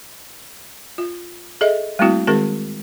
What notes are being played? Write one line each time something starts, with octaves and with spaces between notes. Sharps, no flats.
F4
G#4 A4 D#5 E5
G3 A3 A#3 C4 E4 F#4
D#3 G#3 C4 F#4 G#4 A#4